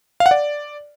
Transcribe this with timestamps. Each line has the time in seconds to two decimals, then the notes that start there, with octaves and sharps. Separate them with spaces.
0.20 F5
0.26 F#5
0.31 D5